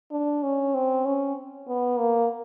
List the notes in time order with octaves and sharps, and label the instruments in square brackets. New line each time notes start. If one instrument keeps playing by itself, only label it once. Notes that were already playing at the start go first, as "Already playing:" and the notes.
[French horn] D4
C#4
C4
C#4
B3
A#3